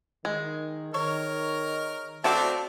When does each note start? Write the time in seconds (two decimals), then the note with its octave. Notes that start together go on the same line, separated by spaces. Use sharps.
0.25 D#3 G#3
0.94 D#3 A#4 C#5
2.24 A3 C4 D4 F#4 A4 F5 A5 D6